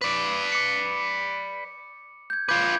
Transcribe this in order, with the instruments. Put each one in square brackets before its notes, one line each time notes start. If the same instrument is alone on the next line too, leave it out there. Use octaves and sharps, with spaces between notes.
[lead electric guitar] B4 D5
[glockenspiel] D6 C#7
G6 G#6
[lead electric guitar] F4 B4 [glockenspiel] D6 G6 G#6